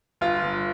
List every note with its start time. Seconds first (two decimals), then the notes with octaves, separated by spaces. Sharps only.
0.21 G1 F4
0.44 G1